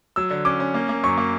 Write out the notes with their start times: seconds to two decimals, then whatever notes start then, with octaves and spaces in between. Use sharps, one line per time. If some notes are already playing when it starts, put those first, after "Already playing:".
0.16 F#3 E6
0.30 D3
0.45 C#4 D6
0.60 C#4
0.74 A#3
0.89 A#3
1.04 F#2 C#6
1.17 A#3